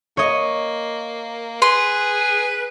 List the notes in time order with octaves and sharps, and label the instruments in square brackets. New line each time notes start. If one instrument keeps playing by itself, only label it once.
[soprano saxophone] A#3 [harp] C#5 D#5
[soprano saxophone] G#4 [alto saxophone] B4 [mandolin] C6